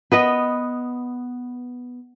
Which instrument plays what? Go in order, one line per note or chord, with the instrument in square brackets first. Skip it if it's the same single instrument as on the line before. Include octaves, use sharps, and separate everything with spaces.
[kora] B3 B4 D#5